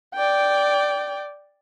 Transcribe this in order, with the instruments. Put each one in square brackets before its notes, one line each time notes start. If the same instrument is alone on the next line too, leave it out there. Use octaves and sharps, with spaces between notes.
[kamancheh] D5 G5